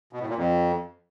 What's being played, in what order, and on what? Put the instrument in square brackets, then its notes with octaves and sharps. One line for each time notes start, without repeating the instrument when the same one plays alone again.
[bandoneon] B2
A2
A#2
F2